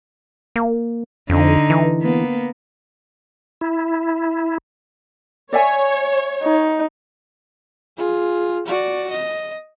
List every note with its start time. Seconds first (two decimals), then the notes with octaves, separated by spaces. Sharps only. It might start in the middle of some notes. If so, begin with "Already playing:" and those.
0.56 A#3
1.30 F2 D3 D#4
1.70 E3
2.02 A#3 B3
3.61 E4
5.53 C#5 D5 E5 G#5
6.43 D#4
7.97 F4 G#4
8.66 F#4 D5
9.11 D#5